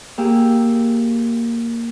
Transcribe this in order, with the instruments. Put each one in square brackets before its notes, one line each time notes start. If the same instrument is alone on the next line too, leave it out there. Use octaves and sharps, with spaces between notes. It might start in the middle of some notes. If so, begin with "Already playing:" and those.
[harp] A#3 G4 G#4 E6